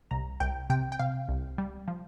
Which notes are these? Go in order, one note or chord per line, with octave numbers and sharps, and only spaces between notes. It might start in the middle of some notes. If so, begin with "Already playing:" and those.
C2 A#5
C2 G5
C3 G5
G5
C3 F5
C2
G3
F3